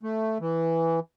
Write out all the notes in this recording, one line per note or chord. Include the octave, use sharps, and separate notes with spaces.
A3
E3